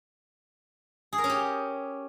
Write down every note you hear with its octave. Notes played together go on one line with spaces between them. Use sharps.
G#4
A#4
C#4
G4